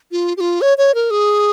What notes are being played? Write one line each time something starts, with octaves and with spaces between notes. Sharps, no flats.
F4
G4
F4
C#5
C#5
A#4
G#4